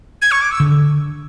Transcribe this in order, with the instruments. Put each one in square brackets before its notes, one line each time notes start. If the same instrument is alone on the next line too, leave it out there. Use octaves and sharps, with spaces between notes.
[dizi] G#6
C#6
D6
E6
[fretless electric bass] D3